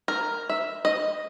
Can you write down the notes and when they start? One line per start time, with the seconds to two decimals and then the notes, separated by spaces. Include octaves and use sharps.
0.08 A#4
0.50 E5
0.85 D#5